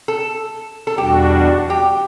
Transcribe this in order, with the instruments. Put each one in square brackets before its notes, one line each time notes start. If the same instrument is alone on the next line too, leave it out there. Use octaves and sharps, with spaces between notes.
[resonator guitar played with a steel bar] A4
A4
[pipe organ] E2 B2 G3 D4 F#4 [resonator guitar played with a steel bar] G4
[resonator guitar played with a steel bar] G4